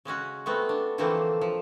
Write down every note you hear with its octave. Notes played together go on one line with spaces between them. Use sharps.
C#3 G#3 C#4 F#4
A3 B3 C4 F#4
D4
D3 E3 F3 A3 A#3 C4
F3